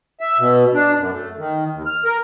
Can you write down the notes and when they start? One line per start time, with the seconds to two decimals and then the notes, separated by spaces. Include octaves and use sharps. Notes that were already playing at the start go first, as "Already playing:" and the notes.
0.20 E5
0.39 B2
0.74 D4
0.98 F#2
1.11 A3
1.38 D#3
1.73 D#2
1.86 F6
2.05 A#4